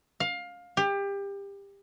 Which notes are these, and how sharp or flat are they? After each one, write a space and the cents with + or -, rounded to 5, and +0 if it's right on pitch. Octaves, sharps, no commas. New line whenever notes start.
F5 +20
G4 +25